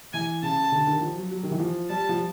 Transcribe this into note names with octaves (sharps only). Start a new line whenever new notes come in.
E3 G#5
C#3 A5
D3
D#3
F3
F#3
F#3
D#3
E3
F3
G3 A5
F3